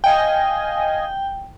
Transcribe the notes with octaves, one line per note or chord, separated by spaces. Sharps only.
D#5 F5 G5 G#5